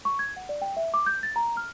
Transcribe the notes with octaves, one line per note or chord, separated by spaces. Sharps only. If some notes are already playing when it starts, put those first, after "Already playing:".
C#6
G#6
F#5
D5
G5
E5
D6
G6
A6
A#5
F6